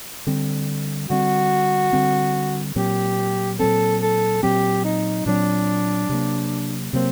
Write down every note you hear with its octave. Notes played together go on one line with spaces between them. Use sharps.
D3 G3 C4
D3 G3 C4 F#4
D3 G3 C4
A#2 F#3 C4 G4
A#2 F#3 C4 A4
A4
A#2 F#3 C4 G4
D#4
A#2 F#3 C4 D4
C3 F#3 A#3
C3 F#3 A#3 C4